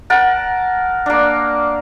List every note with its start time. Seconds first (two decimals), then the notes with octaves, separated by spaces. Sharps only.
0.10 A#4 F#5 A5
1.06 A#3 D4